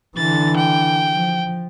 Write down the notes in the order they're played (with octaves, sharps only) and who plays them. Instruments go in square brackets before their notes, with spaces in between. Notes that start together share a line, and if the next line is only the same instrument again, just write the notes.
[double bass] D3 E3 [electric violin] A6
[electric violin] G5
[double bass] F3